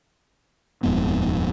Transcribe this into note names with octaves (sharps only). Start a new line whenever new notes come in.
D#1 F2 G#2 B3